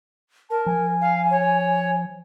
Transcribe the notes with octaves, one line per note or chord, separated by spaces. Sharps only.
A#4 A5
F3 G#5
F5
C#5